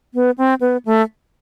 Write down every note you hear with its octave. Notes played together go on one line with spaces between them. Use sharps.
B3
C4
B3
A3